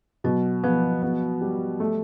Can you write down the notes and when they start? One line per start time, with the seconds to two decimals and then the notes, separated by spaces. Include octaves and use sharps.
0.24 B2 F#3
0.63 F3 B3
1.02 B3
1.41 G3
1.80 A3